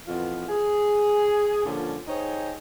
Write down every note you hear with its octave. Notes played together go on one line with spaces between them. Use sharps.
F2 B2 E3 F4
G#4
A#2 D3 F3 G3 C#4
D#4 G4 G#4 C5 C#5